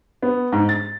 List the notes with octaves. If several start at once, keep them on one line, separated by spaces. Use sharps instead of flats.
B3
G#2
A6